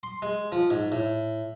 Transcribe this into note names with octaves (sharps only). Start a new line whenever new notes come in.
C6
G#3
F3
G#2
A2